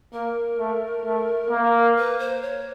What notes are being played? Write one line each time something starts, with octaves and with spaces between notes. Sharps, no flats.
A#3 A#4
A3
A3
A#3
B4
C5
C#5